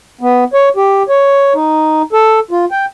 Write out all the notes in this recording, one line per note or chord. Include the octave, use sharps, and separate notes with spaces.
B3
C#5
G4
C#5
D#4
A4
F4
G5